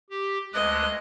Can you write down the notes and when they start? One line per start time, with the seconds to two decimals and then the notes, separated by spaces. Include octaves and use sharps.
0.10 G4
0.53 D2 G#3 D#5 F#6